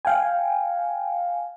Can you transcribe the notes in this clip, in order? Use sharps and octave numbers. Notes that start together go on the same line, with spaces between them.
F5 G5 G#5